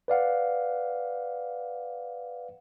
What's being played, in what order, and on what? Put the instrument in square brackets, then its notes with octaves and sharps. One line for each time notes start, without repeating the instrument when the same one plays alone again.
[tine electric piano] B4 D5 F5 F#5